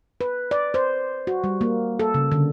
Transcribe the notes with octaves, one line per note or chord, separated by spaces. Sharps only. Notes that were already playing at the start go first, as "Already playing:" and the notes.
B4
D5
C5
F#4
G3
A#3
A4
C#3
D3